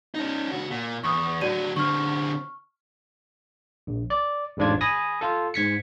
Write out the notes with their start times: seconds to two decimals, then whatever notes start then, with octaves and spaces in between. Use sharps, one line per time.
0.14 C#4 D#4
0.51 C#2 F#4
0.70 A#2
1.04 E2 C#6 D#6
1.41 A2 F#3 F#4 D5 D#7
1.76 D3 C4 C#6 F6
3.87 A#1
4.10 D5
4.57 A1 F2 G#2 D4 F4 G#6
4.81 G#5 B5 D#6 A#6
5.21 F4 A4
5.54 G#2 G#6 B6 C#7